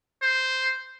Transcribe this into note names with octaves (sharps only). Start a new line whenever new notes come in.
C5